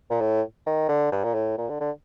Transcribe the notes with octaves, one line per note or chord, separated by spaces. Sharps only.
A#2
A2
D#3
D3
G2
A#2
A2
A#2
D3
D3